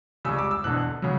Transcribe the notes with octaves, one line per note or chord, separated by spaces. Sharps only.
C#2 C#3 G3 C#4 E6
D6
E6
E1 E2 D3 F#6
C#3 F#3